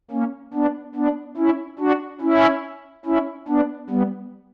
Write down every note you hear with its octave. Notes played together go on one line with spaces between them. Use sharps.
A#3 C#4
B3 D4
B3 D4
C#4 E4
D4 F#4
C#4 E4
C#4 E4
B3 D4
G3 B3